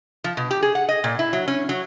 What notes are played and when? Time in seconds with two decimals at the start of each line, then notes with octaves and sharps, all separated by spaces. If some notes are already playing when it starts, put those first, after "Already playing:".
0.24 F3
0.37 B2
0.51 G4
0.63 G#4
0.75 F#5
0.89 D#5
1.04 A#2
1.19 E4
1.33 F#3
1.48 C#4
1.69 F#3